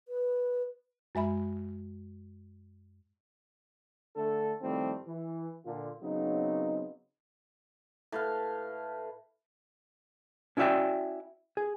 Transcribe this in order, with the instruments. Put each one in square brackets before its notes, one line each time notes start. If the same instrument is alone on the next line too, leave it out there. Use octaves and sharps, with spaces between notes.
[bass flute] B4
[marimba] F#2 G#3 E5 B5
[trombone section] D3 A3 A4
A2 D#3 F3 G3 A3 C4
E3
A#2 D3 F4
C#3 F#3 B3 C4 D#4
[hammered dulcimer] A2 B4 F5
[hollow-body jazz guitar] C#4 E4 F#4 D5 E5 G5
G#4